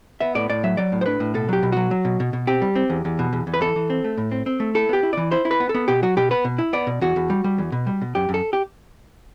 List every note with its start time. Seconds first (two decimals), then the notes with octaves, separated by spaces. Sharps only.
0.20 B3 E5
0.35 A2 D5
0.50 A2 D5
0.63 F#3 E5
0.77 F#3 D5
0.92 A2
1.01 C5
1.06 D4 B4
1.20 A2
1.34 B2 A4
1.49 F#3 G4
1.63 B2
1.72 F#3 F#4
1.91 F#3
2.05 B2
2.20 B2
2.33 B2
2.47 C4 G4
2.62 G3
2.75 C4
2.90 E2
3.05 E2
3.19 B2
3.33 E2
3.47 E2
3.54 B4
3.61 E3 A4
3.76 E3
3.90 C4
4.04 A3
4.17 A2
4.31 C4
4.46 C4
4.60 A3
4.75 E4 A4
4.89 B3 G4
5.03 E4
5.13 E3 D5
5.31 E4 C5
5.45 E4
5.51 B4
5.60 B3
5.69 A4
5.75 B3
5.88 B2 G4
6.03 F#3 F#4
6.17 B2 G4
6.31 B3 B4
6.45 B2
6.58 E4
6.73 B3 D5
6.87 B2
7.01 E2 F#4
7.16 E2
7.30 G3
7.44 G3
7.58 E2
7.72 B2
7.87 G3
8.01 B2
8.15 F#2 G4
8.29 F#2
8.34 A4
8.53 G4